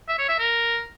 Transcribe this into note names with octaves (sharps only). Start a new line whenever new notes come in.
E5
C#5
E5
A#4